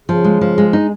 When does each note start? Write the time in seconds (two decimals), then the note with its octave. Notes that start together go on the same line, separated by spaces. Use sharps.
0.08 C#3 F3
0.24 G#3
0.41 F3
0.58 G#3
0.73 D#4